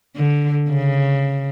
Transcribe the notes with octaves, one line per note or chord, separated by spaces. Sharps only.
D3
C#3